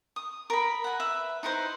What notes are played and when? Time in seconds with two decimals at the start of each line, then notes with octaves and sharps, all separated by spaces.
0.16 D#6
0.50 A#4 B5
0.84 F#5 G#5
1.00 B4 E5
1.43 D#4 E4 B4 C5